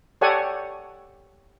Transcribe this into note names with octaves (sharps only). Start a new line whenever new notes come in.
G4 A4 C#5 D5 F#5 G#5